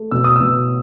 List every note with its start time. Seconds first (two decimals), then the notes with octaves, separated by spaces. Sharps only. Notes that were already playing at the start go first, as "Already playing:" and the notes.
Already playing: A3
0.11 B2 E6
0.24 D#6
0.36 B2 E6